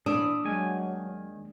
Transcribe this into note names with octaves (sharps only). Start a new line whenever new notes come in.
A#2 E3 D4 D#6 E6
D#2 D#3 F#3 G#3 G#5